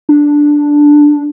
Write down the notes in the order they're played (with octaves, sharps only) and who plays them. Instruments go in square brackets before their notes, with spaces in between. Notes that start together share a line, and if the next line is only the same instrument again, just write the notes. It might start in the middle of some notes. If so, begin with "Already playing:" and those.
[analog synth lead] D4